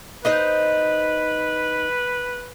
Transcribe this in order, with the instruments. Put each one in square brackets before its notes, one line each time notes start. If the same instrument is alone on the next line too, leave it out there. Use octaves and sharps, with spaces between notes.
[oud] D#4 C5 D#5 [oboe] B4